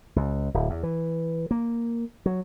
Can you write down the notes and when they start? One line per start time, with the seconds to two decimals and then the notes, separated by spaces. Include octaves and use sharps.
0.16 C#2
0.54 D1
0.70 E2
0.83 E3
1.51 A#3
2.26 F#3